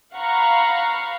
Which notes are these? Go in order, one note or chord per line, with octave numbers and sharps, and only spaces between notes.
F5 F#5 A#5 B5 C#6